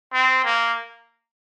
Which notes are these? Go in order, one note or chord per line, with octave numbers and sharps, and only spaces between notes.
C4
A#3